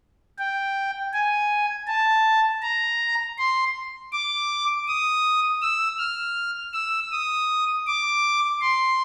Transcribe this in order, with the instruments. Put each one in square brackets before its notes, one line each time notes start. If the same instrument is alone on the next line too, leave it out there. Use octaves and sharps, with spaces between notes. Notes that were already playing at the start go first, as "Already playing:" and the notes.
[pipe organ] G5
G#5
A5
A#5
C6
D6
D#6
E6
F6
E6
D#6
D6
C6